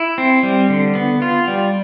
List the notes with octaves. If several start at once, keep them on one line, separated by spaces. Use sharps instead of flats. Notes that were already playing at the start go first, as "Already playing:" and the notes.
Already playing: E4
C4
G3
D3
B3
F4
G3